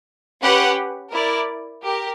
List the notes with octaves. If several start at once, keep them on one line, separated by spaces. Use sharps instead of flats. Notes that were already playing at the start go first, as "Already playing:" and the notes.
C#4 G4 B4 F#5
E4 A#4 D5
G4 A#4